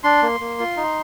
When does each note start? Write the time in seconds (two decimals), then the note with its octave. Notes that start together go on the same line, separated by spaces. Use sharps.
0.04 D4 C6
0.23 A#3
0.40 A#3
0.59 F4
0.77 D#4